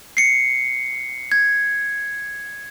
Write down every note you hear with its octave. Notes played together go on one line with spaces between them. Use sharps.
C7 C#7
G#6